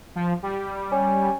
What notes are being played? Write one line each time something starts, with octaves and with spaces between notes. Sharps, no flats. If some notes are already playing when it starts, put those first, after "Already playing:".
F3
G3
C#4